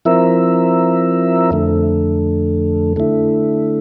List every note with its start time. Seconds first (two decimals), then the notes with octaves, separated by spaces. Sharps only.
0.05 F3 C4 E4 A#4 E5
1.51 F2 D3 A3
2.96 D3 A3 E4